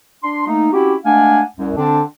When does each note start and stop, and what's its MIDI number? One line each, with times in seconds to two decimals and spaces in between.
0.23 0.42 62
0.23 0.42 84
0.46 0.69 57
0.46 0.69 58
0.46 0.69 63
0.73 0.94 60
0.73 0.94 61
0.73 0.94 64
0.73 0.94 66
0.73 0.94 67
1.05 1.41 56
1.05 1.41 57
1.05 1.41 62
1.05 1.41 77
1.05 1.41 78
1.05 1.41 80
1.57 1.72 36
1.57 1.72 42
1.77 2.02 50
1.77 2.02 60
1.77 2.02 62